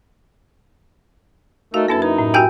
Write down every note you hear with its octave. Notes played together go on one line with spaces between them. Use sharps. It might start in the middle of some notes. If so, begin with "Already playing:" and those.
A3 D#4 F#4 A#4 F5
F#2 A#3 D4 E4 A4 B4
D#4 B4
A2
F#4 G4 G5 G#5 G6